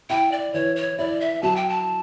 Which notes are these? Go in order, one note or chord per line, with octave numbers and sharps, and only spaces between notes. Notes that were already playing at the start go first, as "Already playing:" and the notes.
E4 G5
D5
E3 C#5
C#5
E4 D5
E5
F#3 A5
G5
A5